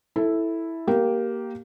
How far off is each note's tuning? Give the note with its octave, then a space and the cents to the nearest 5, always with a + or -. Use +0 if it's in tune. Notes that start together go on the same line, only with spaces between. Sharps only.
E4 -5 A4 +0
A#3 +0 G4 -15